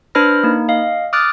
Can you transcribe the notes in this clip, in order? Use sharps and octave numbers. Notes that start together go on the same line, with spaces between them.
D4 B4 C5 B5 F6 A#6
A#3 D#4
D#5 F5
D6 D#6 F6 F#6 A6 D7